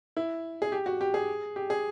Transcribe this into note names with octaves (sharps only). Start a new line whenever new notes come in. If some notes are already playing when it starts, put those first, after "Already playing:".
E4
G#4
G4
F#4
G4
G#4
G4
G#4